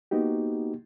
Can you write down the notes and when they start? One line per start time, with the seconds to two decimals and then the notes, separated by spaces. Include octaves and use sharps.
0.11 A#3 B3 D#4 F#4 G4